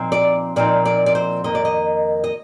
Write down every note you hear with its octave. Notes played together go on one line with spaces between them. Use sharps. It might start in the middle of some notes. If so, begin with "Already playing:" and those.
Already playing: A#2 F3 C4 D#4
D5
A#2 F3 C4 D#4 D5
D5
D5
C5
F2 D#3 A#3 D#5
D5
D#5
D#5